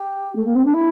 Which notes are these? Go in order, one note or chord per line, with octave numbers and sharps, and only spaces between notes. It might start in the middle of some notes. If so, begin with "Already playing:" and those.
Already playing: G4
A3
A#3
C4
D4
E4